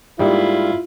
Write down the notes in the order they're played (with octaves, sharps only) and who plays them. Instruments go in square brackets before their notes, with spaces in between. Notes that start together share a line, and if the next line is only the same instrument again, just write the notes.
[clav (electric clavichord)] G#2 G3 A#3 [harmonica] E4 F4